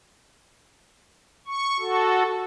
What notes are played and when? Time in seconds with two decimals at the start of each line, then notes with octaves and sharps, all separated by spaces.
1.47 C#6
1.80 F#4 A4